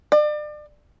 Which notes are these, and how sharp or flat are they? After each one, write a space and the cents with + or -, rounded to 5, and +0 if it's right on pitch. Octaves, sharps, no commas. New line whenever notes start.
D5 +35